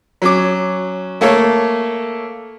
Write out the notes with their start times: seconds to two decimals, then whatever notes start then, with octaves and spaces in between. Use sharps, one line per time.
0.22 F#3 C#4 D6
1.21 A3 A#3 A4 C#5